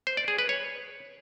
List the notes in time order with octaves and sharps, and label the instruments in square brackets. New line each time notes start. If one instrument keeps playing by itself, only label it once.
[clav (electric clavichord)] C5
D5
G#4
B4
C#5